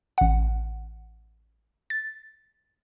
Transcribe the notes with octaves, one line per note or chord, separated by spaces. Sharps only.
A1 F#5
A6